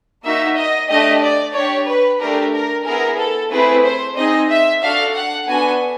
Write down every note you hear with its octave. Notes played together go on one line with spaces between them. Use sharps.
A#3 D#4 F#4 E5
D#5
A3 D4 G4 D#5
D5
D4 G4 C#5
B4
A3 D4 G4 A#4
A#4
B3 E4 G#4 A#4
A4
A3 C4 E4 G#4 B4
C5
C4 D#4 G#4 D#5
E5
D4 F#4 A4 F5
F#5
B3 D4 F#4 A4 G#5